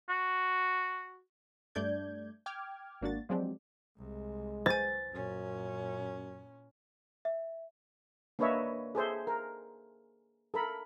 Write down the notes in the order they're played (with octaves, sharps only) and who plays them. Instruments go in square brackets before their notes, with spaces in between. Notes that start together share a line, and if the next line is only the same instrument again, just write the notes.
[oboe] F#4
[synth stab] G2 A3 D4 D5 G6 G#6
G5 D6 F6 G#6
G#1 A#3 D4 F#4 A6
F3 F#3 G#3 C4 D4 G4
[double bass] C2 [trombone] G#3
[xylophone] C5 G#5 [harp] A6
[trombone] F#2 [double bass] A#2 C#4
[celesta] E5
[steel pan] A#3 D4 B4 C#5 D#5 E5
G#4 A4 C5 E5
A#4
A4 A#4 B5